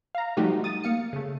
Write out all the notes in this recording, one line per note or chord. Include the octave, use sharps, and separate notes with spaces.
F5 A#5
F3 G3 A3 D#4 F#4 G4
D#6 A6 D#7
A#3 F5 C#7
C#3 A3